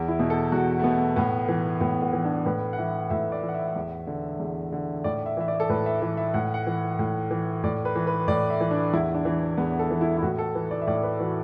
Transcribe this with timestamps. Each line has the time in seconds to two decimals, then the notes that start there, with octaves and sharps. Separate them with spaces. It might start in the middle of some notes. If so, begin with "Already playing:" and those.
Already playing: E2
0.08 E4
0.19 B2
0.30 A4
0.52 E2 F#4
0.79 A3
0.84 B2 B3
1.16 A2 B3
1.48 E3
1.81 A2 B3
2.02 B3
2.13 E3
2.25 D4
2.46 A2 B4
2.73 F#5
2.78 E3 E5
3.10 A2 E5
3.32 D5
3.43 E3
3.49 F#5
3.54 E5
3.76 E2
4.07 D3
4.40 E2
4.72 D3
5.04 A2 D5
5.26 E5
5.37 E3 E5
5.48 D5
5.60 A4
5.69 A2 B4
5.86 E5
6.02 E3 E5
6.17 E5
6.34 A2 F#5
6.54 F#5
6.67 E3
6.99 A2
7.31 E3
7.63 A2 D5
7.85 B4
7.96 E3
8.07 B4
8.28 A2 D5
8.50 E5
8.60 E3
8.71 D4
8.93 E2 E4
9.14 D4
9.25 E3
9.58 E2 B3
9.79 A4
9.90 E3
10.01 E4
10.17 E4
10.23 A2 F#4
10.38 A4
10.55 E3 B4
10.71 D5
10.82 E5
10.87 A2 D5
11.03 B4
11.20 E3 F#4